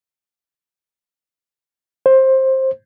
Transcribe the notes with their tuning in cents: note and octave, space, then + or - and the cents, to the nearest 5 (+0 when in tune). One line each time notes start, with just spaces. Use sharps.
C5 +15